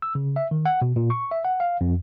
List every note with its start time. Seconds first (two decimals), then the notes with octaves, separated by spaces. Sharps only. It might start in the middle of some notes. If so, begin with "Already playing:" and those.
0.02 E6
0.15 C#3
0.36 E5
0.51 D#3
0.66 F#5
0.82 B2
0.96 A#2
1.10 C#6
1.31 E5
1.45 F#5
1.60 F5
1.81 F2